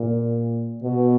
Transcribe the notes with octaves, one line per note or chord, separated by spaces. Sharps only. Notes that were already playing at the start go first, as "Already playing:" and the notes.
Already playing: A#2
B2